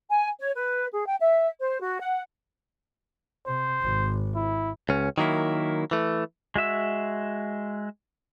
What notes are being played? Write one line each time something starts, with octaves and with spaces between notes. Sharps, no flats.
G#5
C#5
B4
G#4
G5
E5
C5
F#4
F#5
C3 C5
G#1
E4
C#2 C#4
D#3 F#3 A#3 E4
E3 A3
G#3 F#4 E5 E6